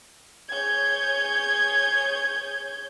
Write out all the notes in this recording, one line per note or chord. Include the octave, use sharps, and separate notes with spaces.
G#4 C#5 G6 G#6